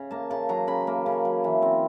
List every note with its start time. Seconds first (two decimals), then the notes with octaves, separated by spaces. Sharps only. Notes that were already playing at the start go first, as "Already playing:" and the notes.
Already playing: C#3
0.11 A#3 A5
0.31 C#3 A5
0.49 F#3 A#5
0.67 C#3 B5
0.87 A#3
1.06 C#3
1.25 F#3
1.44 E3
1.62 C4